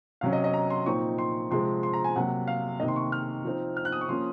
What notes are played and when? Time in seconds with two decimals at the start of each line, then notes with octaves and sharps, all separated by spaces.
0.21 C3 F#3 C#4 F5
0.33 D#5
0.44 D#5
0.54 A#5
0.70 C6
0.86 A#2 F3 C4 D#4 C#6
1.19 C6
1.51 C3 F3 G#3 C4 C6
1.83 C6
1.93 A#5
2.04 G#5
2.16 C3 F#3 A#3 F#5
2.47 F5
2.80 C3 D#3 A#3 D#5
2.88 C6
2.96 C#6
3.12 F6
3.44 F3 C4 D#4
3.77 F6
3.85 F#6
3.92 D#6
4.01 C#6
4.09 F3 A#3 C#4 C6